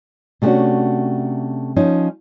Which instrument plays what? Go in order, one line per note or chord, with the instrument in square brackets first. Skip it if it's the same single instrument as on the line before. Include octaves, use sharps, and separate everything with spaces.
[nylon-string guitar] C3 A3 B3 C#4 D4 F#4
F3 C#4 D#4